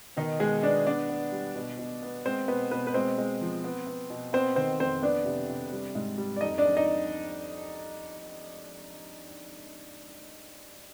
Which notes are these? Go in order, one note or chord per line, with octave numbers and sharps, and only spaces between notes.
B2 D#3 D#4
B2 G#3 G#4
B3 D4 D5
B3 D4 D5
B3
G3
B2
B2
B3
G#3 C4 C5
B2 B3 B4
B2 B3 B4
B4
G#3 C4 C5
G#3
F3
B3
B3
B2
B3 C4 C5
D#3 C4 C5
F2 C4 C5
B3 D4 D5
C3
C3
G3
G#2
G3
D5
F2 D#4 D#5
D4 D5
F2
D#4 D#5